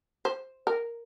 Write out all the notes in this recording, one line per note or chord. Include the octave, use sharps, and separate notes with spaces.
C5
A#4